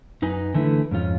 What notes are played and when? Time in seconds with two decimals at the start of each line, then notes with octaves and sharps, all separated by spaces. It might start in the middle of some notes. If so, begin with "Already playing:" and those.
0.22 F#2 D#4 B4 G#5
0.54 D3 E3 A3 E4 B4
0.91 F2 G#2 C#4 F4